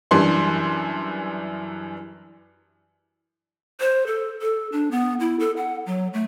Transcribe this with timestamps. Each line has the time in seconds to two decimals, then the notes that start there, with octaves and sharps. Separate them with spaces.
0.11 F#2 E3 G3 D4 C6
3.80 C5
4.07 A4
4.42 A4
4.72 D4
4.91 B3
5.20 E4
5.40 A4
5.57 F#5
5.86 F#3
6.13 A3